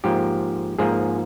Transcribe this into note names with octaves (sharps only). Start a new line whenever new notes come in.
G#2 F3 A#3 G4
G#2 F3 A#3 G#4